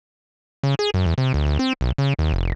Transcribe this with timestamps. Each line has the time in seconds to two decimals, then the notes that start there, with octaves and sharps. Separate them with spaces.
0.63 C#3
0.79 G#4
0.94 F#2
1.06 E2
1.18 C3
1.34 D2
1.46 D2
1.59 C4
1.81 B1
1.98 C#3
2.19 D#2
2.33 F1